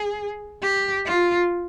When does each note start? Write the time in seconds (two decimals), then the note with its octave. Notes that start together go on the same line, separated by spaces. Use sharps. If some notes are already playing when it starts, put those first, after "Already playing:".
Already playing: G#4
0.62 G4
1.05 F4